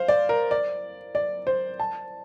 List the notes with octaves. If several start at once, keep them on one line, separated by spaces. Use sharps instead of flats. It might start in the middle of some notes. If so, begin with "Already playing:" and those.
Already playing: C5 F5
D5
A#4
D5
D5
C5
A5